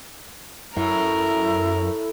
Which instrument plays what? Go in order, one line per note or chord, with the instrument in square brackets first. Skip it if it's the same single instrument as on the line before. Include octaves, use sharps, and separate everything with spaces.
[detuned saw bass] F#2 [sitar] A2 [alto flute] E4 [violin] A#4